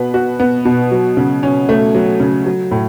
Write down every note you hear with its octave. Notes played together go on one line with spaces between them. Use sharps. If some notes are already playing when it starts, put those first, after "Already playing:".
Already playing: B2 B3 B4
F#4
B3
B2
F#3
C#3
C#4
A3
F#3
C#3
F#3
A2